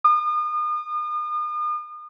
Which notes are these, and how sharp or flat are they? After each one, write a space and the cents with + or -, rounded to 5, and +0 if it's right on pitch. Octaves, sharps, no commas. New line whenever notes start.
D#6 -40